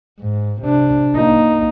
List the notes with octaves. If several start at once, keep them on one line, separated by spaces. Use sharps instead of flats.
G#2
C3 D4
A#3 D#4